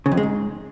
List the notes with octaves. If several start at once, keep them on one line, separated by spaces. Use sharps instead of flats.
C#3
F2
G#3
G#2